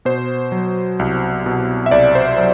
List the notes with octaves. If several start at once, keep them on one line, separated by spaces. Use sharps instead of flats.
B2 C5
F#3
C2
B2
E5
C2 D5
C5
F#3